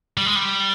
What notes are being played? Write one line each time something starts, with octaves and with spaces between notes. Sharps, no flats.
G3
G#3
G3